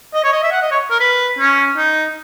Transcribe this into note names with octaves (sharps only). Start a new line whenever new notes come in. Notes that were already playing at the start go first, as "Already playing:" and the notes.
D#5
C#5
D#5
E5
F#5
D#5
C#5
A#4
B4
C#4
D#4